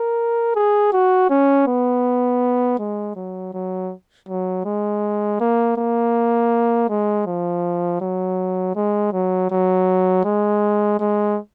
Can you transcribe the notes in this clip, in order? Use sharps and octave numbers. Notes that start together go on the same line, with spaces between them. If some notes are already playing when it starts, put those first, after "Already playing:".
Already playing: A#4
G#4
F#4
C#4
B3
G#3
F#3
F#3
F#3
G#3
A#3
A#3
G#3
F3
F#3
G#3
F#3
F#3
G#3
G#3